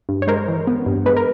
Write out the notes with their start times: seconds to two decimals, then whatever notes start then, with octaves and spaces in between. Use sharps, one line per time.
0.09 G2
0.22 C#5
0.27 G#3 A#4 C5
0.48 E3
0.67 B3
0.86 G2
1.06 G#3 B4
1.17 A#4